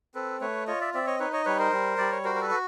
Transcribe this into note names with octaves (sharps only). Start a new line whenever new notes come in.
C4 A4 B4
A3 B4 C#5
F4 C#5 D#5
D5 E5
C4 D5 E5
C#5 D#5
D#4 B4 C#5
C#5 D#5
G3 B4 C#5
A#4 C5
G3
G3 D5
C#5
F#4 A#4 C5
A#4
A4 B4
F#4